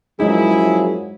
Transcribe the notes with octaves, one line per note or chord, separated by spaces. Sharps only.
F#2 F3 F#3 G#3 D#4 E4 G#4